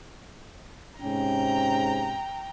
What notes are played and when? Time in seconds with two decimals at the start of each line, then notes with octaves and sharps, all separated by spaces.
1.02 G#2 C3 C#4 G5 A#5